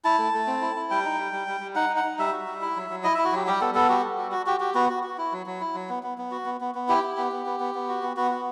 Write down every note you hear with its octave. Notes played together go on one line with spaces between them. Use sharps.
E4 A5
A3
A3
C4
E4
E4
G3 G5
D#4
G3
G3
G3
G3
D#4 F#5
D#4
F#5
D#4
G3 E5
F#4
G3
E4
F#3
F#3
E4 D#5
E4 E5
F#4
F#3 G4
G3 G4
B3 A4
B3 A4
F#4 G4
G3
F#4
F#4
F#4 G4
F#4 G4
B3 F#4
F#4
F#4
E4
F#3
F#3
E4
F#3
B3
B3
B3
F#4
B3
B3
B3
E4 G4
E4
B3
B3
B3
B3
B3
F#4
B3
B3 F#4
F#4